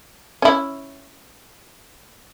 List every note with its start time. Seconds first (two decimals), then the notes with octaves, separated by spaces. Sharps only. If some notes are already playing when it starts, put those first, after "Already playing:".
0.42 C#4 E4